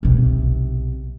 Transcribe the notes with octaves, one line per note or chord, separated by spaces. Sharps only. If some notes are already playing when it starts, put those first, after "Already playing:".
B1 C3